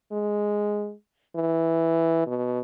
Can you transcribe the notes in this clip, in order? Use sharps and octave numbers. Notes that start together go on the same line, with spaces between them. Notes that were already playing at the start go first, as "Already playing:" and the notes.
G#3
E3
B2